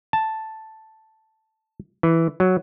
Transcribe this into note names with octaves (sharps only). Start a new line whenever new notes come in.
A5
E3
F#3